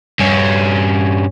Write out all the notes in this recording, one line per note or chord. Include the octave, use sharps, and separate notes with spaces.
G2 C#4